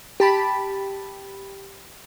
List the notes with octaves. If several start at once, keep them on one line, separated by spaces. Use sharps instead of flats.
G4 A5 B5